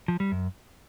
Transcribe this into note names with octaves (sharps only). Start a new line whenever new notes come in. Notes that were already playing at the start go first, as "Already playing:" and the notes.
F3
G3
F#2